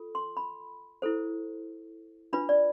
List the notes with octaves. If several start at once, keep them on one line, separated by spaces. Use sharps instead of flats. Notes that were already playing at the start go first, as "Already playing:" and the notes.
Already playing: F4 A4
C6
B5
E4 A4 C5
D4 F4 B4 B5
D5